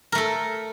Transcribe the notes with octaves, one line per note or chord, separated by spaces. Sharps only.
A3 A4 A#4